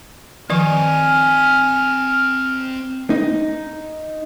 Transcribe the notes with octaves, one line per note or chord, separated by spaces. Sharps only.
D#3 F3 C4 D#5 G#5 C#6 F6
D#4